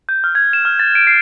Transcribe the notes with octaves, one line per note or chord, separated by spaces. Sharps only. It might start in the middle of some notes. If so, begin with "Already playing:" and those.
G6
F6
G#6
E7
F6
A6
D7
C7